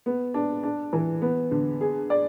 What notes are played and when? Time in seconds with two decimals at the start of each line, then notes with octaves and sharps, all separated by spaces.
0.06 B3
0.34 D4
0.63 D4
0.93 E3
1.22 B3
1.51 D3
1.81 G#4
2.10 D5